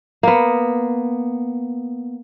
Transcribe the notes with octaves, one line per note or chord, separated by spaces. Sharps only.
A#3 B3